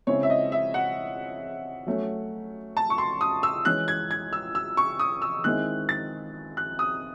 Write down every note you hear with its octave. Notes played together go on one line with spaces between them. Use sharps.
C#3 G#3 C4 E4 C#5
E5
D#5
E5
F#5
F#3 A3 C#4
A5
C#6
C6
D#6
E6
E3 G#3 C#4 F#6
G#6
G#6
E6
E6
C#6
D#6
E6
D#3 G#3 C4 E4 F#6
A6
F#6
D#6